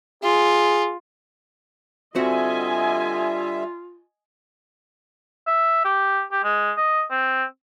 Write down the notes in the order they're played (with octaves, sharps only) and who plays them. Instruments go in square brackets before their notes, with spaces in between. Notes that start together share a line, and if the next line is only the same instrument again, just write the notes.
[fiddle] F4 [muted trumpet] G#4
[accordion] D3 G3 E5 [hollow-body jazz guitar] C4 F#4 [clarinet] F4 [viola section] D#5 G#5
[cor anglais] E5
G4
G4
G#3
D#5
C4